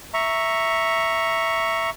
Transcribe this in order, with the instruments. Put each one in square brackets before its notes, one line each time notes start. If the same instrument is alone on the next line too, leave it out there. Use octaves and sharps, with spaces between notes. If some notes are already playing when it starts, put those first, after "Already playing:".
[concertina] E5 A#5 C#6